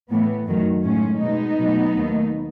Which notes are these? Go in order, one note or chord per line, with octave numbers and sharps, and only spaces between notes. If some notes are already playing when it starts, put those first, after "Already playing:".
A2 E3 A3 B3
F#2 D#3 F#3 A3
A2 G#3 C#4
B2 G#3 B3 D#4
B2 F#3 A3
D#2 D#3 A3